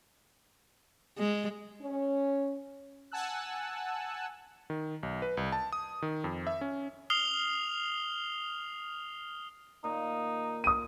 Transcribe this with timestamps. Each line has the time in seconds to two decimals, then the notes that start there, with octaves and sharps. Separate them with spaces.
1.18 G#3
1.81 C#4
3.11 F#5 G#5 A5 E6 F#6
4.70 D#3
5.03 B1
5.22 B4
5.37 C2
5.52 A5
5.73 D#6
6.02 D#3
6.24 F2
6.47 E5
6.61 C#4
7.10 D#6 F6 C7 F7 G7
9.84 A#2 D#3 D#4
10.64 D#6 D#7